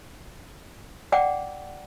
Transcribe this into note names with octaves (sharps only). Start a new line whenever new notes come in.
D5 F#5 G5 D6